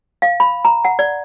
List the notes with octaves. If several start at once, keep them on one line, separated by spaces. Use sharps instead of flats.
F5
B5
A#5
F#5
D5